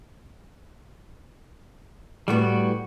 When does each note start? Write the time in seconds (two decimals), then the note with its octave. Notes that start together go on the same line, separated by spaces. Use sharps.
2.28 A2 G3 A3 B3 F#4